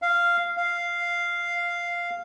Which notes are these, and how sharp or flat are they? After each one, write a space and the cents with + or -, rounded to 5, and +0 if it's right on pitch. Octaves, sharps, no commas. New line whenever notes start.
F5 -10
F5 -5